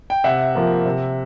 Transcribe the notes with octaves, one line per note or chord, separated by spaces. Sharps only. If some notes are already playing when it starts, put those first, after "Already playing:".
G5
C3 E5 F#5
F3 A#3
C3